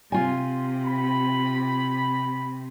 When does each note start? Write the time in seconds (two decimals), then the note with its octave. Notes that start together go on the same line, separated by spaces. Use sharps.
0.12 C3 F4 G#5
0.87 B5